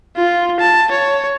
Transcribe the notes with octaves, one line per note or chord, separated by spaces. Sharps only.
F4
A5
C#5